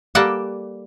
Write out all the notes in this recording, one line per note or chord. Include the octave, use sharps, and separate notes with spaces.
G3 A#3 A4 D5 F#5